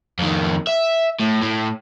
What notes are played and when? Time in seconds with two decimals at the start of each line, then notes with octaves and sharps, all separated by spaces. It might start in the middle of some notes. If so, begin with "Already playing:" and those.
0.19 F2 D#3
0.67 E5
1.20 A2
1.43 A2